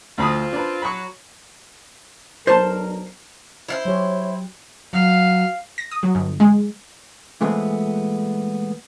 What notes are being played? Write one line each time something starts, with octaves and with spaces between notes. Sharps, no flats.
D2 C4 F4 B5 D#6
D4 B4
F#3 B5 C#6
B1 D4 A#4 C5 A5
E4 F4 C5
F#3 G4 C#5
F#3 F5
A#6
D#6
F#3
G1
G#3
A#2 E3 G#3 A3 B3 C4